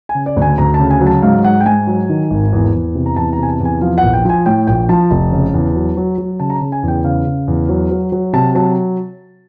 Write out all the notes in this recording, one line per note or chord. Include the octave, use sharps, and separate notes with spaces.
G#5
C#3
D5
D2
G#5
D2 A#5
A5
C#3
G#5
F#3
A5
G#2 F5
G#2 F#5
G5
G#2 G#5
F#3
D#3
G#1
E2
E2
C3
A#5
E2 A5
A#5
C3 G#5
A5
E2
G#5
F3 F5
F#5
A#1
G5
F3 G#5
A2 G5
A#1 G5
F3 A5
F1
C#3
E2
F#3
F#3
F#3
C#3 A5
A#5
A5
C#3
G#5
E2
G5
C#3 F5
C#3
E2
F#3
F#3
F#3
C3 A5
F#3 A5